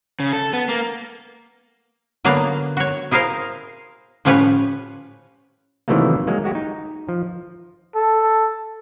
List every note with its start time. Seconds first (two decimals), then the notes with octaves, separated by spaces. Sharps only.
0.20 C#3
0.33 A4
0.53 B3
0.69 A#3
2.25 D3 F#3 A#3 B3 D4 F5
2.77 F#4 C#5
3.11 E4 G#4 A#4 C5 F5
4.25 A2 F3 C#4 G4 B4 C#5
5.88 C3 D#3 E3 F#3 A3 A#3
6.27 F#3 G#3 A#3
6.44 G#3 F#4 G4
6.55 D#4
7.09 F3
7.95 A4